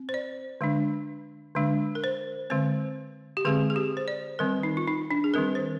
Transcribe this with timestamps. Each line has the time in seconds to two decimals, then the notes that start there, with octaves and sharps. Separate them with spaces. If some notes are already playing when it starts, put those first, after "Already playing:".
Already playing: C4
0.09 C5
0.14 D5
0.61 D3 G#3 D4
1.55 D3 G#3 D4
1.95 A#4
2.04 C5
2.50 D3 G#3 C4 C5
3.37 G4
3.45 D3 G#3 C4 G#4
3.70 G#4
3.76 G4
3.97 C5
4.08 D5
4.39 D#3 G3 C4 A#4
4.63 D#4
4.77 F4
4.87 D#4
5.11 D4
5.24 G#4
5.34 D#3 G3 C4 A#4
5.55 C5